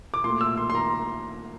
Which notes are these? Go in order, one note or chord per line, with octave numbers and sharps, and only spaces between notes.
D6
A#2 A3 C6
E6
C6
C6
A#5